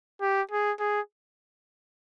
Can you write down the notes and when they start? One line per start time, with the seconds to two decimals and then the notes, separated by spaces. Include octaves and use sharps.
0.21 G4
0.51 G#4
0.80 G#4